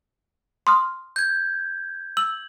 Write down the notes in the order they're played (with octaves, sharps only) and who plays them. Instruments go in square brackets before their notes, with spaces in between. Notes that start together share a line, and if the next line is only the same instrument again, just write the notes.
[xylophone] C6 D#6 F6
[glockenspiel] G6 G#6
[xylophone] E6 [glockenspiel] F#7